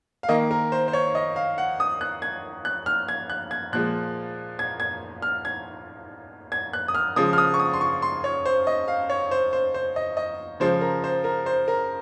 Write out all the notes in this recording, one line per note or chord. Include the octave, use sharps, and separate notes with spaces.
F5
D#3 A#3 D#5
A#4
C5
C5
C#5
D#5
F5
F#5
D#6
F#6
G#6
F#6
F6
G#6
F#6
G#6
A#2 F3 G#3 F#6
G#6
G#6
F6
G#6
G#6
F#6
D#6
F6
C#3 F3 G#3 D#6
F6
D#6
C#6
D#6
C6
C#6
C6
C#5
C5
D#5
F5
C#5
C5
C5
C5
D#5
D#5
C#3 F3 G#3 C5
A#4
C5
A#4
C5
A#4